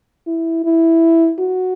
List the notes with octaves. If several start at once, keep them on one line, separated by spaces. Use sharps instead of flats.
E4
E4
F#4